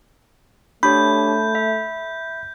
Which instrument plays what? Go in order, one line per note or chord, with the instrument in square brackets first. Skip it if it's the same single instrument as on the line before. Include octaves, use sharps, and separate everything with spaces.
[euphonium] A3 [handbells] D4 G4 C#5 [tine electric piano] B5 [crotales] G6
[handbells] E5